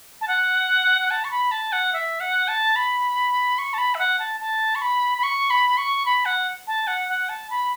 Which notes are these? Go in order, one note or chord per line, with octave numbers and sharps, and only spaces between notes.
A5
F#5
F#5
A5
C#6
B5
A5
F#5
E5
F#5
A5
B5
C#6
A5
B5
E5
F#5
A5
A5
C#6
B5
B5
C#6
B5
C#6
B5
F#5
A5
F#5
F#5
A5
B5